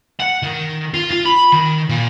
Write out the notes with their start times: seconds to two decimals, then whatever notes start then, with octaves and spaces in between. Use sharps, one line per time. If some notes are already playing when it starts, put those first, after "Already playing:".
0.20 F#5
0.42 D#3
0.94 F4
1.11 F4
1.26 B5
1.52 D#3
1.89 A#2